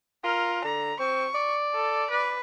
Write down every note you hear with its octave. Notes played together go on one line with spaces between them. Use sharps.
F4 A#4
D3 A#5
C4 C#6
D5
A4
B4